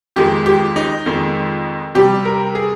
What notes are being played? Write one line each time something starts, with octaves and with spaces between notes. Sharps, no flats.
F2 D#3 G#3 G4
G4
D#4
F2 D#3 G#3
C3 G3 G4
A#4
G#4